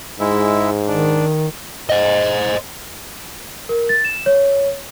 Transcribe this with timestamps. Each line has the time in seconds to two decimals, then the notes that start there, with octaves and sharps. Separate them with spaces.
0.20 G#2 G#3 E4 E5
0.88 D#3 D4
1.90 C5 D#5
3.69 A#4
3.89 A6
4.04 E7
4.26 C#5